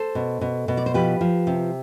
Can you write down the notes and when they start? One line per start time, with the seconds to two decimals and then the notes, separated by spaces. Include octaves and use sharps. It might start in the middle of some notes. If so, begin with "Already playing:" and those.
Already playing: A4 C5
0.15 B2
0.41 B2
0.68 B2
0.77 D5
0.86 C5
0.94 F3 G4 B4
1.21 F3
1.47 C3